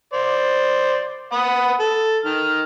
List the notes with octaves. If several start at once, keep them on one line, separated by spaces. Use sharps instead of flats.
C5 D5
F#5 B5 D#6
A4
D#3 F6